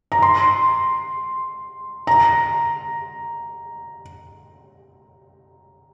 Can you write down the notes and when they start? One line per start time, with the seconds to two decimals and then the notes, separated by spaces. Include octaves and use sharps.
0.12 A#5
0.22 C6
2.07 A#5